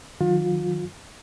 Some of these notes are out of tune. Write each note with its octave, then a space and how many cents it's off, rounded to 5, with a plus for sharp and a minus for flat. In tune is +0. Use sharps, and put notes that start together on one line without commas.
D#3 +0 F#3 -25 F4 +35